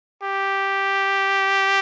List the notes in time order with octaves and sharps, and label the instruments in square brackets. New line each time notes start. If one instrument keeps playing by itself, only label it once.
[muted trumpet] G4